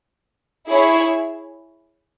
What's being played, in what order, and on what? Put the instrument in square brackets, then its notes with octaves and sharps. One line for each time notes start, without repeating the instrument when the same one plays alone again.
[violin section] E4 G#4 C#5